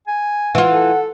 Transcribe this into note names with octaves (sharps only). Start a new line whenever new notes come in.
G#5
E3 F4 F#5
A4